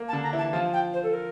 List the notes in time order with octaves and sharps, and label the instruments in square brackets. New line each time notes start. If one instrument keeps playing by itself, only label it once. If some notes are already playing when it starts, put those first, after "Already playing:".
Already playing: [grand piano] A#3
[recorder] A5
[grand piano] D3 D4
[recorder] A#5
[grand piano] E3 E4
[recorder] A5
[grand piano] F3 F4 [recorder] A5
[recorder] G5
C5
A4
A#4